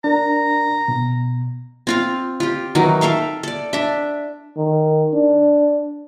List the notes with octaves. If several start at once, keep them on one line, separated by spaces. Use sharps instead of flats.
D4 A#4 A#5
B2
C4 F4 F5
F4 G4
D#3 E3 F#3 D#4
A4 E5 F5 G5
A4 D5
D4 E5
D#3
D4